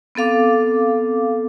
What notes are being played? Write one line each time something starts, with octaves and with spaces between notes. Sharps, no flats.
B3 C4 A4 F5 D6